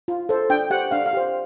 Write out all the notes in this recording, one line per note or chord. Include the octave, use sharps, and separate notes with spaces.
F4
A4 C5
D4 G5
G4 C5 F#5
D4 F5
F5
G4 C5